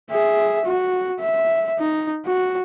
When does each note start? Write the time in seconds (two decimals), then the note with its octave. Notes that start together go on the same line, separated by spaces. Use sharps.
0.10 G#4 E5
0.66 F#4
1.19 E5
1.79 D#4
2.26 F#4